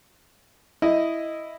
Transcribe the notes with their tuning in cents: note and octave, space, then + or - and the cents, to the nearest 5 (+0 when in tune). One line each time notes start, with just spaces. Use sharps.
E4 +0 D#5 +0